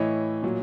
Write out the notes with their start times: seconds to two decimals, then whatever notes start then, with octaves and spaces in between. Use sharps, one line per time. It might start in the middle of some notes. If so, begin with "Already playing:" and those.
Already playing: A2 E3 C#5 D#5
0.43 A#2 F#3